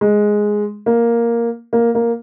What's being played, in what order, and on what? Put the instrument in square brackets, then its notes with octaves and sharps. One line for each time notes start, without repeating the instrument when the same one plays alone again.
[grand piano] G#3
A#3
A#3
A#3